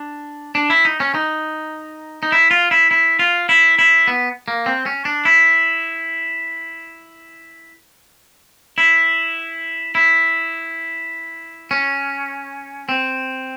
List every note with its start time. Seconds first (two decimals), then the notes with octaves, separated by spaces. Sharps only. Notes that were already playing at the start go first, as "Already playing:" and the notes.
Already playing: D4
0.55 D4
0.70 E4
0.85 D#4
1.00 C#4
1.15 D#4
2.23 D#4
2.32 E4
2.51 F4
2.71 E4
2.91 E4
3.19 F4
3.49 E4
3.79 E4
4.08 B3
4.48 A#3
4.66 C4
4.86 C#4
5.05 D4
5.25 E4
8.78 E4
9.95 E4
11.71 C#4
12.89 C4